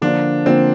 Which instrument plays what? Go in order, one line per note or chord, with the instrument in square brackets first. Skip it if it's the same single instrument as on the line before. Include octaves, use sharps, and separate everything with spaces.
[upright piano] D3 F3 A#3 F4 [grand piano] D4
[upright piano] D3 F3 A#3 F4 [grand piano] C4